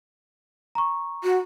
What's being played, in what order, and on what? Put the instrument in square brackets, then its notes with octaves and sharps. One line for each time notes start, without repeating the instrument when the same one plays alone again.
[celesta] A#5 C#6
[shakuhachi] F#4